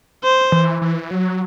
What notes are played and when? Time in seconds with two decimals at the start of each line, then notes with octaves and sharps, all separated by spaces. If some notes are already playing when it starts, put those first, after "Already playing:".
0.24 C5
0.52 E3
0.82 E3
1.11 F#3